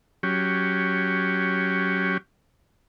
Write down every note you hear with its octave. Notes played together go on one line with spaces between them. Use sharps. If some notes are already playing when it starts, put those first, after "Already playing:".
F#3 C#4 G4